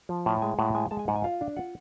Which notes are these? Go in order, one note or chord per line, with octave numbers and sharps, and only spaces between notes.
F3
A2 A5
G#3 G#5
A2 F#5
G#3 G#5
G#3 A5
G#5
G#2 F#5
G#5
F4 F5
D4
F4 F#5